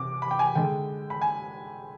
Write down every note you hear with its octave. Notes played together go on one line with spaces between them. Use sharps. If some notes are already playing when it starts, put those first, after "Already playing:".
Already playing: C3 D6
B5
G5
G#5
D3 G#3 G5
B5
G#5